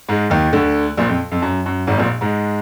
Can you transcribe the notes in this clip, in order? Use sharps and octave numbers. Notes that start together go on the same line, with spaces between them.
G#2 G#3
D#2 D#3
D2 D3
A#1 A#2
F2
F2
F#2
F#2
G#1 G#2
A#1 A#2
G#2 G#3